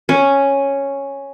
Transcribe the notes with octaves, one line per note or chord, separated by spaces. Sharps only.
C#4